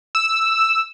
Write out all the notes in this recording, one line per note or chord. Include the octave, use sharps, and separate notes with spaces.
E6